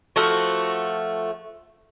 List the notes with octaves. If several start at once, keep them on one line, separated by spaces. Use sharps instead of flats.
F3 A3 F#4